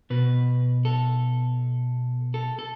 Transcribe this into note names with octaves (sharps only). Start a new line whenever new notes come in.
B2 B4
A4
A4
A4